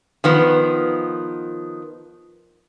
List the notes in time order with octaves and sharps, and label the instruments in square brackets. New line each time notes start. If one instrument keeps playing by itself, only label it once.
[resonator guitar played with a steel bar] D#3 F3 B3